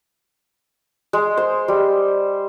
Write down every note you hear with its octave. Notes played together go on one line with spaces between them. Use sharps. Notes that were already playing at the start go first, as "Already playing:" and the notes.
G#3
C5
G3